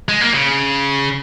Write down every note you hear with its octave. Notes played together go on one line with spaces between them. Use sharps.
G#3
A#3
C#3